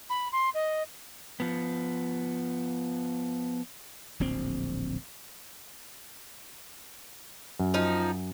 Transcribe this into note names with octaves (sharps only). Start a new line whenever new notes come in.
B5
C6
D#5
F3 B3
D1 A#1 C4
F#2
F3 D#4